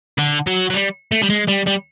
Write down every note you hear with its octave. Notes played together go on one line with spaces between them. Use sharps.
D3
F#3
F#3
G3
A3
G3
G#3
G3
G3